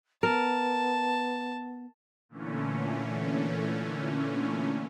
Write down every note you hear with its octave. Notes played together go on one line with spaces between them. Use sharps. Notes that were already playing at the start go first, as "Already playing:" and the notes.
B3 A#4 A5
A#2 D3 E3 A3 C#4